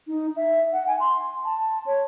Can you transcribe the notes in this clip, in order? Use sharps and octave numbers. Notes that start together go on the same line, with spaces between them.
D#4
E5
F#5
G#5
C6
A5
C#5